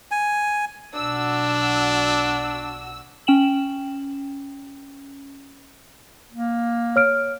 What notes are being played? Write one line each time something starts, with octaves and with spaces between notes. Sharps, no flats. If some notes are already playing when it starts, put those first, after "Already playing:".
G#5
B1 D4 F#4 E6
C#4 G5 E7 F#7
A#3
C#5 F6 D7